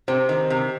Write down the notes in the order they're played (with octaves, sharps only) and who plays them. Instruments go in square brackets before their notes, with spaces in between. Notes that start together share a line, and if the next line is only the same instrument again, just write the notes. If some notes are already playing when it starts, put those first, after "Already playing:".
[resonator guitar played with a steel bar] C3 [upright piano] C4
[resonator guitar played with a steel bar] D#3
C3